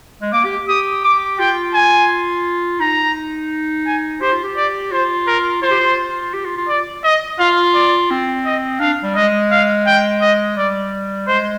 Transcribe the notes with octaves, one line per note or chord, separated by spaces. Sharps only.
G#3
A#3 D6
G4
G4 D#6
D6
F4 G5
G#5
D#4 A#5
G#5
G4 C5
F4
G4
D5
F4 C5
A#4
F4 C5
G4
F4
G4
F4
F4
D5
D#5
F4 F5
D5
C4
D#5
D4 F5
G3
G#3 D#5
F5
G5
D#5
G3 D5
G#3 C5